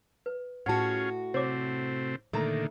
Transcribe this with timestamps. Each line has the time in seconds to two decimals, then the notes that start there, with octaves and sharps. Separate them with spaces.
0.26 B4
0.66 A2 C#4 F4 F#4 G#4 F#5 A5
1.34 C3 A3 C4 C5 C#5 D6
2.33 A#2 D3 D#3 A3 A4 A#5 B5